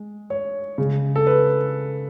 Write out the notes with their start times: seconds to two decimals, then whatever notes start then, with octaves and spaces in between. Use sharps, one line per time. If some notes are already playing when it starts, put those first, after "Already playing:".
Already playing: G#3
0.30 C#5
0.78 C#3 G#3
1.16 A4
1.27 B4